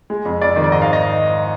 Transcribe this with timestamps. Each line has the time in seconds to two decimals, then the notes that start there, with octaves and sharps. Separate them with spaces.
0.10 G#3
0.25 F2
0.41 F2 D5
0.56 D#3
0.64 D5
0.72 G#2 D#5
0.82 F5
0.93 D#5